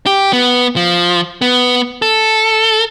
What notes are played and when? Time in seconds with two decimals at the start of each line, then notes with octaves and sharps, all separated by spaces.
0.06 G4
0.33 B3
0.76 F3
1.42 B3
2.02 A4